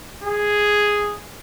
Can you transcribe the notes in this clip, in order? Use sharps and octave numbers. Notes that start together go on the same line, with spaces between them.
G#4